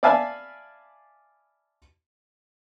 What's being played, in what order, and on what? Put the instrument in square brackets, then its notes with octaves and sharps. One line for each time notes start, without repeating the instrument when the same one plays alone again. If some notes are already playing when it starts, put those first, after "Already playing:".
[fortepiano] D5 E5 F5 G#5 A5 B5